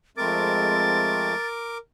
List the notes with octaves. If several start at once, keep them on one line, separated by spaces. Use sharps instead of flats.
F2 G#3 A3 C4 A#4 D6 A6